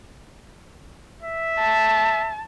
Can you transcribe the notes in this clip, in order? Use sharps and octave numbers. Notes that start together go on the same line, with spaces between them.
E5
A5